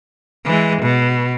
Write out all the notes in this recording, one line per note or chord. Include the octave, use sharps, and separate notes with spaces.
E3 G#3
B2